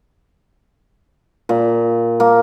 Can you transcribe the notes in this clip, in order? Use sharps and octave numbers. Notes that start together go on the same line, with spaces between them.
A#2
A#3